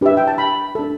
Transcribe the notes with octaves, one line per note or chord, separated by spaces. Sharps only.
D4 G4 B4 E5
G5
A5
B5
D4 A4